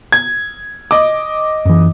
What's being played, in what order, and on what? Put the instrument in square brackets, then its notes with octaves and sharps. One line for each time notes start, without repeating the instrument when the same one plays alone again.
[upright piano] G#6
D#5 D6
[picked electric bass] F#2 E3